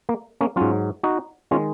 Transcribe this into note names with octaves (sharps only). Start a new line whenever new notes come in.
A#3
A#3 C#4
G#2 F#3 C#4 F4
D#4 F#4
D#3 G#3 C#4 F4